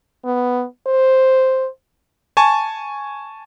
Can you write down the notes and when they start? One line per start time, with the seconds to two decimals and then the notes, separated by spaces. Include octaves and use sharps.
0.25 B3
0.87 C5
2.37 G#5 A5 C#6